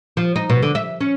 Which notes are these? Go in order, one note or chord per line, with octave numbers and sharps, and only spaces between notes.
F3
D#4
B2
D3
E5
C#4